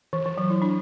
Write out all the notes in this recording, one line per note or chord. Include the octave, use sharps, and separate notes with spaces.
E3
E3
F#3
E4
D4